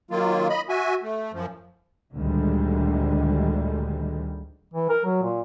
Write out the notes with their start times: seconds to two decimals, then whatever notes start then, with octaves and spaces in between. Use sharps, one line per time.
0.11 D#3 F#3 A#3 F4
0.49 D#5 B5
0.69 F#4 E5 G#5
1.03 A3
1.33 F#2 F3
2.15 D2 A#2 D3 D#3 G3 G#3
4.74 E3
4.89 A#4
5.05 F#3
5.23 A#2